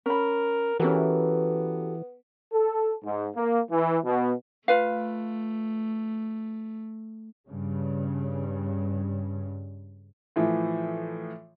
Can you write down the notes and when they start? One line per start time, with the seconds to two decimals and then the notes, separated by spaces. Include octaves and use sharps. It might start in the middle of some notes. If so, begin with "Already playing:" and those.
0.06 C#4 A#4 B5
0.80 E3 B3 C#4 F#4 G4 A4 A#4
2.53 A4
3.03 G#2
3.36 A#3
3.71 E3
4.05 B2
4.68 A3 F4 B4 F5
7.47 G2 C#3
10.36 A2 E3 F3